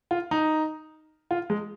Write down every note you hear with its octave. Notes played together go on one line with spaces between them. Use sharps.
F4
D#4
F4
G#3